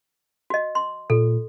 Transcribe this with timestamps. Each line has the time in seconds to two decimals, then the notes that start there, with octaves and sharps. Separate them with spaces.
0.50 F#4 D#5
0.75 C6
1.10 A#2 A4